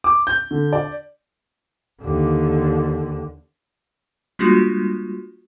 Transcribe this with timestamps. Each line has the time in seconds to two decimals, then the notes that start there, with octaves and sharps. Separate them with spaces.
0.04 D6
0.27 G6
0.51 D3
0.73 D5
2.02 D#2 D3
4.39 G3 G#3 A#3 D4 F4 F#4